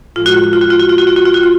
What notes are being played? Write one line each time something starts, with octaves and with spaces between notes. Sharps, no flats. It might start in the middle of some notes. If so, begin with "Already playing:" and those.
A2 F3 G#3 F4
F#4
F4
F#4
F4
F#4
F4
F#4
F4
F#4
F4
F#4
F4
F#4
F4